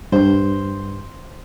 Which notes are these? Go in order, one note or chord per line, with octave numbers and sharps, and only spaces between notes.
G2 C5